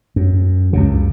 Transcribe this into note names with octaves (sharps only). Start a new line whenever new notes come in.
F#2
C#2 F#2 C#3